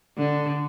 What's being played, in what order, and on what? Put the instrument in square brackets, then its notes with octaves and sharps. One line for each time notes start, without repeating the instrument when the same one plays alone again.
[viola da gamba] D3